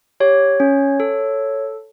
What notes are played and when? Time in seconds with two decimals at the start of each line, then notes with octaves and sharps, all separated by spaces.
0.20 G4 C#5
0.60 C#4
1.00 A4